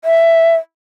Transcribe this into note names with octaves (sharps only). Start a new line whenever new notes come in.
E5